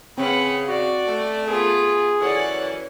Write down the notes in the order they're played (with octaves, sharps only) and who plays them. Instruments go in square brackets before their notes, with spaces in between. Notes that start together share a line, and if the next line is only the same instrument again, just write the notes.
[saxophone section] C#3 [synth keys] C4 C#4 [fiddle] B4 F#5
[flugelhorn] F#4 [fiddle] D5
[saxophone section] A3
[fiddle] B3 F4 [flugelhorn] G#4 [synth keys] D7
[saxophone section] F#2 E3 C#4 [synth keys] A4 C#5 [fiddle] D5 F#5